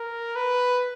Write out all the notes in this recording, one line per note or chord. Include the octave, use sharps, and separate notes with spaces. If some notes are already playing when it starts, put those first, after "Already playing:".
Already playing: A#4
B4